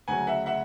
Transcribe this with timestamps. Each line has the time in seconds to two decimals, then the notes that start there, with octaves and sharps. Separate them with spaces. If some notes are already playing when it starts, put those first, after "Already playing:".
0.08 D2 C#3 F#3 F#5 G#5
0.27 E5 F#5
0.46 E5 F#5